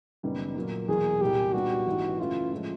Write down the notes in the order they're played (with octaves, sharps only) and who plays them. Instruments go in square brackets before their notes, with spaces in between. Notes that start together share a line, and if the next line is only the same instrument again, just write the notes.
[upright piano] F#1 F#2 D#3 G3 B3
A#2 F#3 A#3
[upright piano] E2 B2 F#3 A#3 [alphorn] G#4
[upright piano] C2 A#2 G3 A#3 [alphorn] G4
[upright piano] B1 A#2 G3 B3 D4 [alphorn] F#4
[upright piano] A1 G#2 E3
[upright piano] F#2 C#3 E3 A3 [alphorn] F4
[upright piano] A2 F3 G#3 C#4